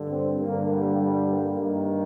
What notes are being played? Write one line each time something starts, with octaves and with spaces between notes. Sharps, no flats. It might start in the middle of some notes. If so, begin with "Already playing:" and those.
Already playing: G2 D3
C4
G2 D3 A#3
G3
G3
A#3
G2 D#3